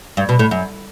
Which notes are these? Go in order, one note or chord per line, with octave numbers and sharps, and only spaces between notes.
G2
B2
A2
F#2